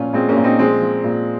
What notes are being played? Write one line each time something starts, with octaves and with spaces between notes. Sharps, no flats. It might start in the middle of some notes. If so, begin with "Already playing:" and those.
Already playing: A#2 F3 C#4 F4
A#2 G#3 C4
A#3 C#4
A#2
C4 D#4
F3 G#3 C4
F3
A#2